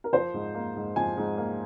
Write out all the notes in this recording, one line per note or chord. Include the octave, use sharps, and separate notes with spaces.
A#4
F3 C5
G#2
A#3
G#2
F3 G#5
G#2
A#3